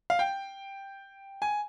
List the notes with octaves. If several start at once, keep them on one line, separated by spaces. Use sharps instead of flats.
F5
G5
G#5